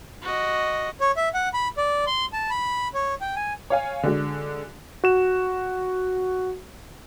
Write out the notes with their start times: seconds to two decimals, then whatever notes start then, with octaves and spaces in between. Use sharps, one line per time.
0.22 F#4 D#5
1.00 C#5
1.17 E5
1.34 F#5
1.54 B5
1.77 D5
2.07 C6
2.33 A5
2.50 B5
2.94 C#5
3.21 G5
3.36 G#5
3.70 C#5 F5 G#5
4.03 D3 G#3 F#4
5.04 F#4 E7